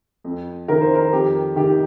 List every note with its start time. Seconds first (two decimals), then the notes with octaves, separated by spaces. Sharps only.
0.24 F2
0.68 D#3 A#4
0.81 C5
0.95 A#4
1.13 F2 G4
1.56 D#3 G4